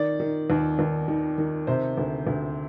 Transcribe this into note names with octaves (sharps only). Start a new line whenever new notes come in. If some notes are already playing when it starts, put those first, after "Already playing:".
Already playing: D#3 D5
D#3
D#2
D#2
D#3
D#3
C3 C5
D2
D2